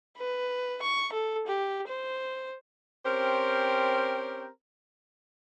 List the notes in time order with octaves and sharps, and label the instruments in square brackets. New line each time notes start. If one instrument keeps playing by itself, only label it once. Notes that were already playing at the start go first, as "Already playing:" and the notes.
[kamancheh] B4
C#6
A4
G4
C5
[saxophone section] C4 C#4 G4 A#4 C5